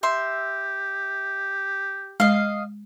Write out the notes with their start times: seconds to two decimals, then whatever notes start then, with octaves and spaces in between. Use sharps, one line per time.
0.03 G4 E5 C6
2.20 G#3 D#5 F5